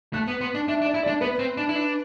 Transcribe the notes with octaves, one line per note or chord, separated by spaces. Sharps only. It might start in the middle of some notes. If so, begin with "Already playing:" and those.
A3 F#6
B3
B3 C6
D4
D4 E5
D4
D5
E4
D4 D5
B3 B4
C4
D4
E4
D4